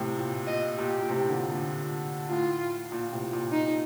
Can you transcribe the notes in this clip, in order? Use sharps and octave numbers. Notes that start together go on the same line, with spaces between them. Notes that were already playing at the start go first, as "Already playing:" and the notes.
Already playing: A2 C3
A#2
A#2 D#5
A#2 G4
A#2
A2 C3
A#2 D3
A#2
A2 F4
A#2
A2 C3
A#2
D#4